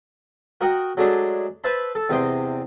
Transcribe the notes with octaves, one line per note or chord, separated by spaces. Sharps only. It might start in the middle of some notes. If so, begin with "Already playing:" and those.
F#4 A#4 D#5 F#5 G5
F#3 G#3 A3 D4 G#4
B4 C5 E5 A5 B5
A4
E2 C3 D#5 G5 C6